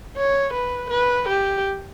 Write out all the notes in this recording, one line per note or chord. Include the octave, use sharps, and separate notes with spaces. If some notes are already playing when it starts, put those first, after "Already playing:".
C#5
B4
B4
G4